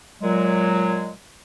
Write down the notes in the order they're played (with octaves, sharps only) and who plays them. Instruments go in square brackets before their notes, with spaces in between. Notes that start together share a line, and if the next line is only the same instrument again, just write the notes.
[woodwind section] A#2 F#3 G#3